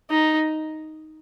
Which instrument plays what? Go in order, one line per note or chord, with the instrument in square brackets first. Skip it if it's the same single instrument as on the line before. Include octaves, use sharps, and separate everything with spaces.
[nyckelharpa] D#4